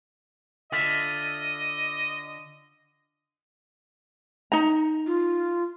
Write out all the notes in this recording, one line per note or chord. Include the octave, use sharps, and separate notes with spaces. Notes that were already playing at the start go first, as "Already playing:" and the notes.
D3 F4 D#5 E5
D#4 A#5
F4